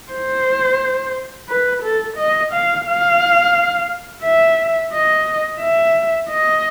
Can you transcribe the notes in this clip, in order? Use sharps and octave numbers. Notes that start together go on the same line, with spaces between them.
C5
B4
A4
D#5
F5
F5
E5
D#5
E5
D#5